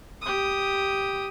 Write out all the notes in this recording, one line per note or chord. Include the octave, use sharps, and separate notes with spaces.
G4 D#6